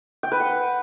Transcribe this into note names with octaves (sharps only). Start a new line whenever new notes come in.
G5
B4
F#5